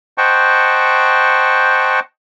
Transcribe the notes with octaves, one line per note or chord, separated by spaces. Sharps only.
C5 D#5 F#5 G5 A5 C#6